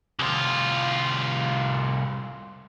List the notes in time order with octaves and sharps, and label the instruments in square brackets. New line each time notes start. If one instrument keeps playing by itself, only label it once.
[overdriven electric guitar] C2 F4